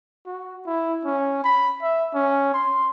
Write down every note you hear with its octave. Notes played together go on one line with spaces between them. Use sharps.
F#4
E4
C#4
B5
E5
C#4
C6